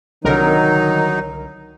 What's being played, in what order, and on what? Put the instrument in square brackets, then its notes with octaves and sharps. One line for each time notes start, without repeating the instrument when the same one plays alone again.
[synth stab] C2 D3 A#4 [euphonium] D#3 [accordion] F#3 D#4